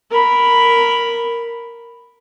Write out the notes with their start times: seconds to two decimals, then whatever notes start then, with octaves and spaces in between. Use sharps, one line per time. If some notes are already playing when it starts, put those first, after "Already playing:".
0.11 A#4 B5